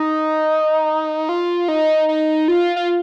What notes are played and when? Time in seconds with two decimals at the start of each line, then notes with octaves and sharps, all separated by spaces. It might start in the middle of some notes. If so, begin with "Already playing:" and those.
Already playing: D#4
1.29 F4
1.68 D#4
2.09 D#4
2.48 F4
2.76 F4